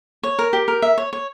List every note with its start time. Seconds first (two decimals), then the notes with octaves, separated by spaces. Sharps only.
0.23 C#5
0.39 A#4
0.53 G4
0.68 A#4
0.82 E5
0.98 C#5
1.13 C#5